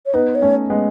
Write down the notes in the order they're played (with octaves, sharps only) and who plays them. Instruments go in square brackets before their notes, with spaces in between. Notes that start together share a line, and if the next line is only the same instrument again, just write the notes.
[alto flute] C#5
[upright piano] B3 D#4 [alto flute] B4
[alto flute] C#5
[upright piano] A3 C#4
G#3 B3